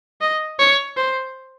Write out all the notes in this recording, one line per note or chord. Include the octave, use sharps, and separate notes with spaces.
D#5
C#5
C5